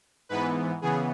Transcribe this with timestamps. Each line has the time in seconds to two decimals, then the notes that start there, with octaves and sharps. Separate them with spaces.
0.29 G#2 E3 B3 B4
0.82 C#3 E3 B3 G#4